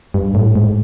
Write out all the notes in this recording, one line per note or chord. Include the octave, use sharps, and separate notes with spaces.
G2
A2
G#2